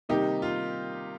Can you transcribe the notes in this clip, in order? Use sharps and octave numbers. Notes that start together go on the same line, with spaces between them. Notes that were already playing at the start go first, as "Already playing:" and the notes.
C3 D#3 G3 A#3 D#4 G4
F4